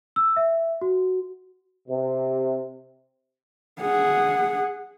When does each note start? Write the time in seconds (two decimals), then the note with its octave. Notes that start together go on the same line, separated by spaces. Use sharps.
0.16 E6
0.36 E5
0.82 F#4
1.88 C3
3.81 G#4 F#5